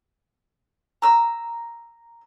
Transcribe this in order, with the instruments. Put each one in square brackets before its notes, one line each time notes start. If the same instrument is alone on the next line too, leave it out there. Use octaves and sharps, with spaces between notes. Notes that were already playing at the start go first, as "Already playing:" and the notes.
[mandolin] A#5 E6